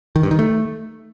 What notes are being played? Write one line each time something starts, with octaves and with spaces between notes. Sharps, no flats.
D#3
G2
D#3
A3